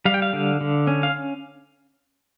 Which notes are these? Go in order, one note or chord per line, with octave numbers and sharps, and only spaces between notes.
G3 F5
G5
F5
D3
D3
C#4
F5